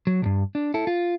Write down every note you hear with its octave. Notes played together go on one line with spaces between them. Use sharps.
F#3
B1 G2
D4
E4 A4
F4